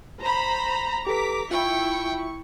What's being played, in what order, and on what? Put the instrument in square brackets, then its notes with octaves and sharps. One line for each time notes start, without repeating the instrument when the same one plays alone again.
[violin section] C5 B5 [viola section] A#5
[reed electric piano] G4 A4 B4 [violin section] D6 B6
[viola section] E4 [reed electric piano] F4 [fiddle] G5 [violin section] C#6